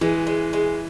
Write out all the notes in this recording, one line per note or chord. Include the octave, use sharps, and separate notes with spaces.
E3 G#3
G#3
G#3